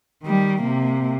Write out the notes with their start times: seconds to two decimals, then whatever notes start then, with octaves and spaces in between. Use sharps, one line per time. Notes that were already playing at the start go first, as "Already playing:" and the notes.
0.23 D#3 G3
0.62 C3 A#3